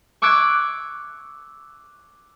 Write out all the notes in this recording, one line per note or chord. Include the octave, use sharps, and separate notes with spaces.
C#6 D6 E6 F#6 G#6 D7